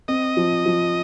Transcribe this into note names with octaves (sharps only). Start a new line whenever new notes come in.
C4 D#5
F3
F3